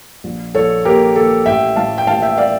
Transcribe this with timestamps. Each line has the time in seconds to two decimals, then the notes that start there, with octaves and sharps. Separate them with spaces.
0.24 A#1
0.55 A#1 A4 C#5
0.85 A#3 G4 A#4
1.16 A#3 A4
1.46 A1 E5 G5
1.76 A2 F5 A5
1.98 G5
2.07 A1 F5 A5
2.22 E5 G5
2.38 D5 F5